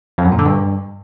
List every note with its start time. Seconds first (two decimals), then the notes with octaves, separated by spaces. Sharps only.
0.18 F2
0.25 F#2
0.32 A#2
0.39 D3
0.46 G2